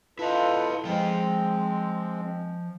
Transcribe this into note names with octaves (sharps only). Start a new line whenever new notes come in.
E4 F4 A4 B4 D#5
F3 G#3 C4 G5